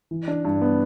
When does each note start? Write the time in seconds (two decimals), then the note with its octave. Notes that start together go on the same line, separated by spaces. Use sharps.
0.11 E3
0.28 D4
0.45 G2
0.62 B3